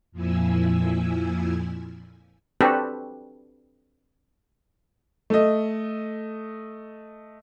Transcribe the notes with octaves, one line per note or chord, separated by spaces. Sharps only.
F2 A#2 F3 E4 G#5 E6
C4 D4 F#4 G4 A4 B4
A3 D#5